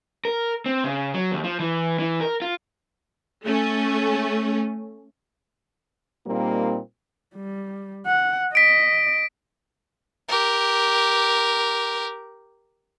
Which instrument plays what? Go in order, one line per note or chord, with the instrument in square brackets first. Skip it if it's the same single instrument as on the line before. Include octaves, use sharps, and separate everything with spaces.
[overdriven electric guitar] A#4
C4
C#3
F#3
D#2
F3
E3
E3
A#4
F4
[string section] A3 C#4
[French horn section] A#2 G3 A#3 C4 D#4
[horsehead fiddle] G3
F#5
[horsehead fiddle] D#5 [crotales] B6 D7
[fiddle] G4 A#4